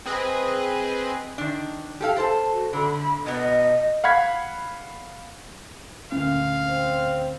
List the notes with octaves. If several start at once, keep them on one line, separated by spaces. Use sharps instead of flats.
C4 G#4 B4 D#5
D#3 D4
G4 A4 F5
A4 C5 A5
F#4
D3 B5
B2 B3 D#5
F5 F#5 B5 G#6 B6
D2 A#2 C#4 F5
C4